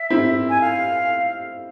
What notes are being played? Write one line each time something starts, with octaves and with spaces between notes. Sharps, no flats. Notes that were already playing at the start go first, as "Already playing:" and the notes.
Already playing: E5
C4 E4
G#5
F5